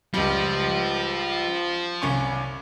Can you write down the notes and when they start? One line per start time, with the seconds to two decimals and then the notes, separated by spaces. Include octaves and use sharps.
0.14 C#2 F3 G3
2.02 C2 C#4 C#6